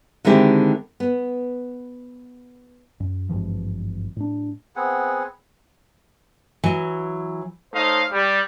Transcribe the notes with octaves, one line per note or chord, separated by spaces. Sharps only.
D3 D#3 G#3 C4 E4 G4
B3
F#2
G#1 G2 E3 F3
A2 D4
B3 C4 G#4 F#5
E3 F#3
A3 D#4 C5 C#5 D#5 F5
G3